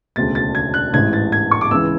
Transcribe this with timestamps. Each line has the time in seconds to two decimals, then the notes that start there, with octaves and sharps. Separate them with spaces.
0.16 E1 D2 C#3 A6
0.35 A6
0.55 G#6
0.74 F#6
0.93 A1 G#2 E3 G#6
1.13 A6
1.32 G#6
1.51 C#6
1.61 D6
1.71 C#2 C#3 E3 E6